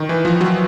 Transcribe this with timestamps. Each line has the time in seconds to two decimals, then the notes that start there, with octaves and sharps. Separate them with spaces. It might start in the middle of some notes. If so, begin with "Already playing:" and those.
Already playing: D#3
0.09 E3
0.25 F3
0.41 F#3